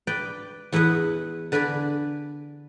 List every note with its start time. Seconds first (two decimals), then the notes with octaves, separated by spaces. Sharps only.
0.07 B4 D5 G5
0.72 E2 E4 B4 D#5 F#5
1.52 D3 B4 D5 G#5 B5